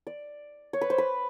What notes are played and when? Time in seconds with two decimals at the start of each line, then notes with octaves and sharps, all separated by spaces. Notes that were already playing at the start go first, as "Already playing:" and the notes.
0.07 D5
0.73 C#5
0.81 B4
0.90 C5
0.98 B4